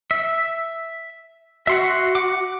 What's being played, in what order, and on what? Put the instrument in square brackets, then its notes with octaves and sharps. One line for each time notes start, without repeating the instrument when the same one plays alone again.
[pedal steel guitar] E5
[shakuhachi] F#4 [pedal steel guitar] E5 C6 C#6
[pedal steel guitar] F#5 D6